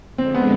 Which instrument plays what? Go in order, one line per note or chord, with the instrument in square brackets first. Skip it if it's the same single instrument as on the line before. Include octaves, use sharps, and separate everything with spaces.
[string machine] F2 D3 G#3 [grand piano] C4
[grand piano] B3